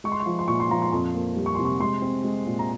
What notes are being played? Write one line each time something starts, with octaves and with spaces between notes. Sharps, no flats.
G#3 C#6
C6
C#6
F3
C6
A#2 C#6
C6
F3 A#5
C6
F2
A#3
G3
C#6
C3 C6
C#6
G#3 C6
C4
G#3
A#2
A#5